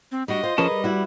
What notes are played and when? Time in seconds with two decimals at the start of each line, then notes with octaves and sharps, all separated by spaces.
0.12 C4
0.28 G3 D4 F#4 D#5
0.43 F4 C5
0.58 F3 C#4 G#4 A#4 B4 A5
0.71 G3
0.84 E4 F#4